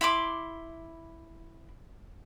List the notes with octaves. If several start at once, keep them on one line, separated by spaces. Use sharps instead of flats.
E4 B5 C6 D6